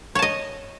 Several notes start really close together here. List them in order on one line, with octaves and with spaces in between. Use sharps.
C#5 A5 D#5